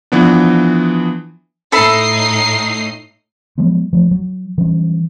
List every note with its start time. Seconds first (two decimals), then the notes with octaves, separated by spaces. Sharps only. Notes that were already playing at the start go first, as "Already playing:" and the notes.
0.12 E3 F3 B3 D4
1.72 A2 D#4 A4 E5 B5 C7
3.58 F3 F#3 G#3 B3
3.93 F3 A3
4.11 F#3
4.58 E3 F#3 G3 C#4